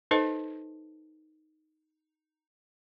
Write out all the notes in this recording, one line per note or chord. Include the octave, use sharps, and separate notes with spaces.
D#4 A4 B4 C5 D#5 A5